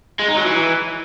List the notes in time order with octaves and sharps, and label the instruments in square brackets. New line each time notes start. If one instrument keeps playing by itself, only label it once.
[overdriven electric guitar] G#3
D#4
F#3
E3